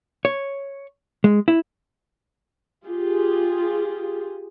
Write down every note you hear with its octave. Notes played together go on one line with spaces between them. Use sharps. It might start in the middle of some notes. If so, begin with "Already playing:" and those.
C#5
G#3
E4
F4 G4 G#4